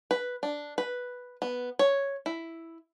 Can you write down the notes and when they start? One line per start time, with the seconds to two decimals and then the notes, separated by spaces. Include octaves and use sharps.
0.11 B4
0.43 D4
0.78 B4
1.42 B3
1.79 C#5
2.26 E4